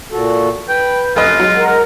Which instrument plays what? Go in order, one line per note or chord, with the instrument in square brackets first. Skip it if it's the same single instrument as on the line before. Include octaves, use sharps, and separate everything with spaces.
[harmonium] A#2 F#4 A4
[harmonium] B4 [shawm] G5
[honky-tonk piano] F1 B4 D#5 [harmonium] F#2 [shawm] F4
[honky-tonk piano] F#3 [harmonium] G#3
[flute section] A#4 F#5